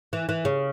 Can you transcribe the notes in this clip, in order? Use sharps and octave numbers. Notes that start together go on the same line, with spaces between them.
E3
E3
C#3